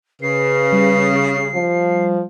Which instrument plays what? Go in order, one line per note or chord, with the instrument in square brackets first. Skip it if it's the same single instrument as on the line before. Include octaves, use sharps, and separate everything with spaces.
[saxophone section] C#3 [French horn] B4 [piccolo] C7
[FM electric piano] G3
[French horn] F3